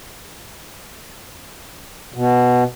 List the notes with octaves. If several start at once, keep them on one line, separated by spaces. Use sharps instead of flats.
B2